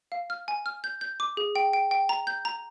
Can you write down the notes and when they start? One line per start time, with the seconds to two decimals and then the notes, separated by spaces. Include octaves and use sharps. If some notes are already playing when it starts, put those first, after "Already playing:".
0.12 F5
0.30 F6
0.48 G#5
0.66 F6
0.84 G6
1.01 G6
1.20 D6
1.37 G#4
1.56 G5
1.73 G5
1.91 G5
2.09 A#5
2.27 G6
2.45 A#5